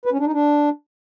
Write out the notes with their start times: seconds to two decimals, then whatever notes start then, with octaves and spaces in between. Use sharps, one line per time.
0.06 B4
0.12 C#4
0.19 D4
0.26 D#4
0.33 D4